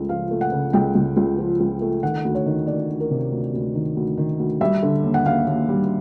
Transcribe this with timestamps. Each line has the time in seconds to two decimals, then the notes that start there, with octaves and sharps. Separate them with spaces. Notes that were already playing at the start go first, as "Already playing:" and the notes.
Already playing: C#2 C#3 A3
0.09 F3 F5
0.31 A3
0.41 F#5
0.52 C#3
0.73 C#2 G5
0.95 C#2
1.17 C#2
1.38 F3
1.60 C#2
1.81 A3
2.03 D#3 F#5
2.25 D2
2.35 C#5
2.46 D#3
2.67 D2 D5
2.89 D2
3.00 A#4
3.10 C3
3.32 D2
3.54 D2
3.75 D#3
3.97 D2
4.17 D#3
4.39 D2
4.61 G3 E5
4.83 D3
5.03 D#2
5.14 F#5
5.25 D#2 F5
5.47 D#2
5.69 G3